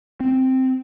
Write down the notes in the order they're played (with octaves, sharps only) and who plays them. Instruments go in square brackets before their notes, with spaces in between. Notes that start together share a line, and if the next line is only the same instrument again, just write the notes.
[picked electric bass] C4